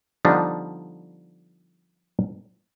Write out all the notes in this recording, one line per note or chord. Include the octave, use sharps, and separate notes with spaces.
D3 F3 G3 B3 D4 D#4